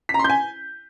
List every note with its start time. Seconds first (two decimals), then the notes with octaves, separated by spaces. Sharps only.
0.09 B6
0.14 A#5
0.19 C6
0.24 G6
0.30 G#5